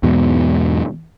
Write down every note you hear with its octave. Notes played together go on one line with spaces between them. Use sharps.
E2 G#2 B2